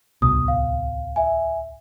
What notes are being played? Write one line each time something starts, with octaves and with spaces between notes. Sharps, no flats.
D1 C2 B2 D#6
F5
E5 G#5